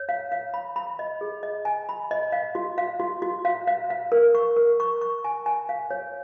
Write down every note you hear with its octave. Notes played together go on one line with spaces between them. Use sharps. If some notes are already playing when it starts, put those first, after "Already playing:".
Already playing: C#5
F5
F5
B5
B5
D#5
G#4
D#5
G#5
B5
D#5
F5
F#4
F5
F#4
F#4
F5
F5
F5
A#4
C#6
A#4
C#6
C#6
G#5
G#5
F5
C#5